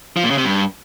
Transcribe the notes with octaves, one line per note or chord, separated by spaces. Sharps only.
F3
A#2
C#3
C3
G2